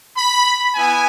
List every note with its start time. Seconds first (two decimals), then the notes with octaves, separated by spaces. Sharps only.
0.16 B5
0.73 B3 E4 G#5